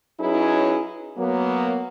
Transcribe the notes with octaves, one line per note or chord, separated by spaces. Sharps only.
F#3 C#4 D#4 E4 G#4 B4
F#3 A#3 B3